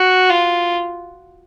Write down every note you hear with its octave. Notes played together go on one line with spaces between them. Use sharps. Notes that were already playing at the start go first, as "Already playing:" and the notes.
Already playing: F#4
F4